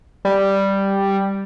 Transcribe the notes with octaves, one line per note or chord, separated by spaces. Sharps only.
G3